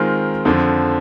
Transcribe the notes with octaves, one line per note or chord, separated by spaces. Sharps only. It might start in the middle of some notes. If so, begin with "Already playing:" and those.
Already playing: D#3 G#3 C4 F4 A#4
F2 D3 F3